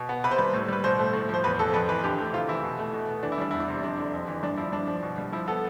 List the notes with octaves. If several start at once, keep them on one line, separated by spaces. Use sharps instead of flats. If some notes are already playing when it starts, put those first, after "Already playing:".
Already playing: B2
B3
C3 B4
C5
G3 B4
A2
G3 B4
B2 C5
A3
A2
F3 C5
E2 B4
B2 A4
F2 B4
E3 B4
D3 G4
A3
C3 F4
E3 E4
B2
A3
B2
B3
E3 D4
E4
G3 D4
E2 E4
D4
C3
F2 D4
D3
F2
E3
G2 D4
F3 E4
G2 D4
F3
B2
G3
F3 E4
B3 A4